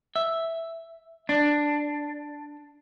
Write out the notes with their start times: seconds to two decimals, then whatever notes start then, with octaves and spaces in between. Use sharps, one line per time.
0.16 E5
1.29 D4